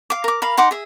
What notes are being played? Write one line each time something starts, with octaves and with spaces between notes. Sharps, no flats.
F5 D6
A#4 D6
A#4 F5 B5
D#4 F#5 C6 D6
G#4 E5